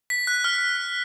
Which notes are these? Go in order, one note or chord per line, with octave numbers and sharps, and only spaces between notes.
B6
F#6
F6